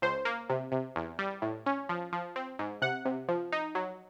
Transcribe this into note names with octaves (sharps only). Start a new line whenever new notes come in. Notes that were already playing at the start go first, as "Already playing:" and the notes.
C#2 C5
A#3
C3
C3
E2
G3
A2
C#4
F3
F3
C4
G#2
C3 F#5
C3
F3
D#4
F#3